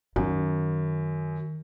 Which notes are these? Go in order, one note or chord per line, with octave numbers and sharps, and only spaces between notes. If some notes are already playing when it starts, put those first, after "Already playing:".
F#2 D#3